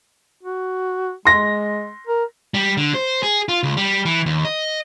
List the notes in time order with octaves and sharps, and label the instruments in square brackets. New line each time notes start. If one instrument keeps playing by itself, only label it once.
[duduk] F#4
[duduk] G#3 [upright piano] C6 A#6
[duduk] A#4
[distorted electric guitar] G3
D3
C5
G#4
F4
C#2
G3
E3
D#2
D#5